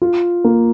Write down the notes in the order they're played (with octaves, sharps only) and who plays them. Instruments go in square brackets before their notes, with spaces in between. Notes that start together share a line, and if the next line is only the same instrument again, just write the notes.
[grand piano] F4
A#3